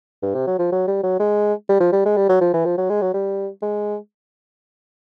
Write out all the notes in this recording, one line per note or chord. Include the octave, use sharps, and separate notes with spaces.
G2
C3
F#3
F3
F#3
G3
F#3
G#3
G3
F3
G3
G#3
G3
F#3
F3
E3
F3
F#3
G#3
F#3
G3
G#3